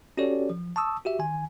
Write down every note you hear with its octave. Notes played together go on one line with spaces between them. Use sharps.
C#4 F#4 G4 A4 C#5 D5
F3
A5 C#6 D#6 E6
F#4 G4 E5
D#3 G#5